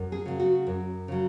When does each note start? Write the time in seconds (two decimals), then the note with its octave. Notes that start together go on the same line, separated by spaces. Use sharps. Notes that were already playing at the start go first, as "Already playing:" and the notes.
Already playing: F#2
0.12 G#4
0.26 C#3 F#3
0.40 F#4
0.67 F#2
1.08 C#3 F#3